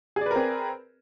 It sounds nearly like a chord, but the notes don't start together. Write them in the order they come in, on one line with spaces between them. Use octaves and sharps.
G#4 D5 B4 A#4 C4